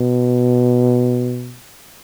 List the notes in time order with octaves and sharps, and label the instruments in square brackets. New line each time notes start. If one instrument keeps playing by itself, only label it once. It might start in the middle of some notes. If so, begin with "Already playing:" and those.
Already playing: [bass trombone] B2